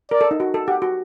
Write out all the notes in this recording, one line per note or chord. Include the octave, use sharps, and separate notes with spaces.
A#4 D5
A4
D#4
F#4
A4
G4 F#5
F#4